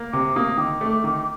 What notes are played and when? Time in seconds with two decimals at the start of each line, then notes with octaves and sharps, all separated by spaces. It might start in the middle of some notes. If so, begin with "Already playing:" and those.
Already playing: A#3
0.12 C3 D6
0.36 A#3 D#6
0.58 D#3 D6
0.81 A3
1.04 D#3